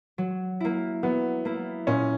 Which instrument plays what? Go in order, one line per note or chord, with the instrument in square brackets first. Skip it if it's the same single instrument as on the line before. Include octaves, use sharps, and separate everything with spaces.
[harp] F#3
A#3 E4
[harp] F#3 [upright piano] B3
[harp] A#3 E4
[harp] A#2 [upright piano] C#4